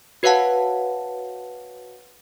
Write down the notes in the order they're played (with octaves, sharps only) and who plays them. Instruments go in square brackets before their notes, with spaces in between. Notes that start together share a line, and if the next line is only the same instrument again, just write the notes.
[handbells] F#4 B4 C#5 F5 F#5 A5